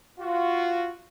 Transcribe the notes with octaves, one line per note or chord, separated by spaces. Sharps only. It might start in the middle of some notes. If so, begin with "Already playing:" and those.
F4 F#4